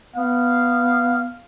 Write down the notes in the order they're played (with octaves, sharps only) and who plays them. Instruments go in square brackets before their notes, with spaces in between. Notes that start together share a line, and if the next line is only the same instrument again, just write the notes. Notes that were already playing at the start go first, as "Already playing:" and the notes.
[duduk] B3 [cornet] F5